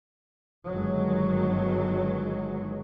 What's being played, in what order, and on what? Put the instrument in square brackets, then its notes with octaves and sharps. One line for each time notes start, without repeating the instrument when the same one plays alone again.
[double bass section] G1 D#3 F#3 G#3